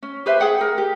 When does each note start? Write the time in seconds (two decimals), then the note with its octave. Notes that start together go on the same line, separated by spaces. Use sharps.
0.03 C#4
0.26 G4 B4 C5 E5
0.40 G#4 E5 F#5 G5
0.61 A#4
0.78 G4